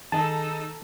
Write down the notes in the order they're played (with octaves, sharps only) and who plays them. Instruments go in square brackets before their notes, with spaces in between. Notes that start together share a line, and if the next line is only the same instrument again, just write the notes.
[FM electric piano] D#3 [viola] D#4 A4 [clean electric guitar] G#4 D#5 [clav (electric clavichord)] A5